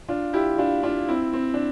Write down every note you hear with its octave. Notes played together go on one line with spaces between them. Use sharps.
D4 F4
E4 G4
D4 F4
D4 F4
C4 E4
C4
D4